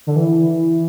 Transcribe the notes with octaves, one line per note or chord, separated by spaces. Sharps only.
D3
E3